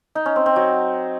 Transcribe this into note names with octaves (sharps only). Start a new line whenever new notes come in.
D#4
C#4
C4
C4
F#3